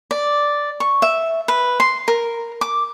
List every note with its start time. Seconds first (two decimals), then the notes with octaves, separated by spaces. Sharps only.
0.11 D5
0.80 C#6
1.02 E5
1.48 B4
1.80 C6
2.08 A#4
2.61 D6